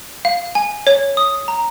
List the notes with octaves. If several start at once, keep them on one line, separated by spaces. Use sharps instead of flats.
F5
G#5
C#5
D#6
A#5